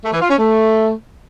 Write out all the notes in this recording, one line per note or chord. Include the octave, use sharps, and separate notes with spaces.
A3
E3
F4
C#4
A3